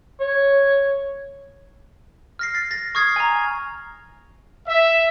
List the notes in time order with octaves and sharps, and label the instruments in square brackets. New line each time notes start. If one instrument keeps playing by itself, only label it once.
[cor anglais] C#5
[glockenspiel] F6 A#6 C7
A6
A6 A#6
C#6 D#6 F6 G#6 C7
G#5 A#5
[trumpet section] E5